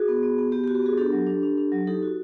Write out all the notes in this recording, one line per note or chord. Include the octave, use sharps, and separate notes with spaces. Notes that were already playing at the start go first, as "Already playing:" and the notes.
Already playing: F#4 G#4
B3
B3
B3
B3 G4
G4
F#4
G4
B3 F#4 G#4
D4 G4 A4
F#3
D4
D4
D4
F#3
D#4 G4 A4
F#4